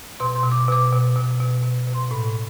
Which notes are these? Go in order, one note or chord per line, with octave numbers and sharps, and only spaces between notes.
B2 C6
C6
B2
D6
B2 D6
B2
B2
B2
B2
B2
C6
A2 B5